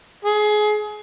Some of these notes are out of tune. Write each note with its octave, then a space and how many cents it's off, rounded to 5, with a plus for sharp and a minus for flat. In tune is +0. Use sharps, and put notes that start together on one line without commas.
G#4 +25